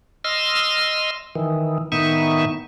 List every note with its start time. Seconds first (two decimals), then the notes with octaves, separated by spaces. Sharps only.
0.24 D#5 C6 E6 F6
1.35 D#3 E3
1.92 A2 D#3 B3 D#4 E5 C#6